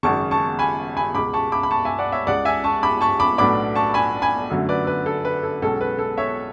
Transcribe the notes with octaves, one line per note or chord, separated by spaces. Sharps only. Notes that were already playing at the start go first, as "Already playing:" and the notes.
G#1 F#2 C#3 A5 C#6
A5 C#6
G#5 B5
G#5 B5
C#2 B2 G#3 B5 D6
A5 C#6
B5 D6
B5
A5 C#6
E5 G#5
D5 F#5
C#5 E5
C#2 C#3 G#3 D5 F#5
E5 G#5
A5 C#6
B5 D6
A5 C#6
B5 D6
B1 A2 F#3 B3 D4 B5 D6
A5 C#6
G#5 B5
G#5 B5
F#2 D3 F#3 A3
B4 D5
B4
A4
B4
A4
B1 B2 G#3 C#4 A4
B4
A4
C#5 E5